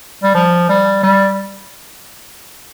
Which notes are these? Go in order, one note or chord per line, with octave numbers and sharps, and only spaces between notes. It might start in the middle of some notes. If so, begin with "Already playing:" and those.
G3
F3
G3
G3